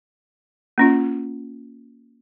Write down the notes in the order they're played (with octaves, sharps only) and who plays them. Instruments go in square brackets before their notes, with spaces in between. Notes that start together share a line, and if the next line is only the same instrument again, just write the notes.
[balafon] A#3 C#4 F4